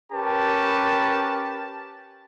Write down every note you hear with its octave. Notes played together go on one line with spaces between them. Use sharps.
C#4 G4 A#4 B4 A5